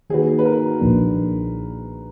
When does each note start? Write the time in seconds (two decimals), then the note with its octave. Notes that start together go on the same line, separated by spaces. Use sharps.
0.10 D#3 A#3 D#4 F#4 G#4 B4
0.39 B4
0.45 A#4
0.80 B1 A#2 F3 A#3 D4